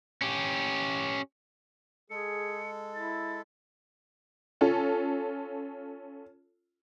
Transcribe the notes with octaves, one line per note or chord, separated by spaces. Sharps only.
C#4 G4
G#3 G#4 A4 C#7
E4 A6
C#4 F4 A4